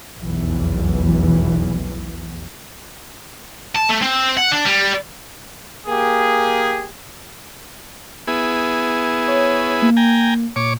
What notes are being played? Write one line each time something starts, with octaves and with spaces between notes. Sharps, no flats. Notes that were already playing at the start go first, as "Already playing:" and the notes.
F1 B1 E2 E3
A5
A3
C4
F#5
D4
G3
A#3 G4 G#4
B3 E4 G#4
C#5
A#3
G5 G#5 A#5
A#2 C#5 D6